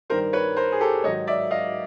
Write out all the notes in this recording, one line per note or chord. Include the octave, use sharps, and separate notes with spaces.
G2 D#3 G3 A#4 C5
B4 C#5
A#4 C5
G#4
G4 A4
G#2 D#3 F#3 C#5 D#5
D5 E5
D#5 F5